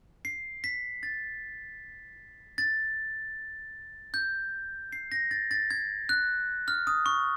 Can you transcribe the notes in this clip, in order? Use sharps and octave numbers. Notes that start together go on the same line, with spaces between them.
C7
B6
A6
A6
G6
C7
A#6
A6
A6
G#6
F#6
F6
D#6
C#6